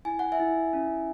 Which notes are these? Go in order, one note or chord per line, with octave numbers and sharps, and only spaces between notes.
E4 G#5
F#5
E5 G#5
E4
C#4